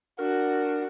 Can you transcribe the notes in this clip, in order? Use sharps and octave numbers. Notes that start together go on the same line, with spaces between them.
D4 F#4 A#4